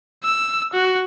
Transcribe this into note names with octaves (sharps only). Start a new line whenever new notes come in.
E6
F#4